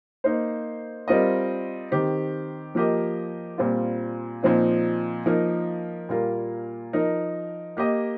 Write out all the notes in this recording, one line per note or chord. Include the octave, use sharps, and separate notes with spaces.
A#3 D#4 C5
G3 C4 F4 A#4 D#5
D#3 C4 G4
F3 A#3 G4 A#4 D#5
A#2 G3 C4 F4
A#2 F3 C4 D#4
F3 A#3 D#4 A#4
A#2 G3 A#3 F4 A#4
F3 D#4 A#4
A#3 G4 D#5